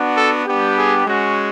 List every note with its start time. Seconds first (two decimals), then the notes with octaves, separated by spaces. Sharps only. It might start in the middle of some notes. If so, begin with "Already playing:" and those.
Already playing: B3 D4 F#4
0.16 A4
0.46 G3 B3 D4 G4
0.76 G#4
1.06 G#3 C#4 F#4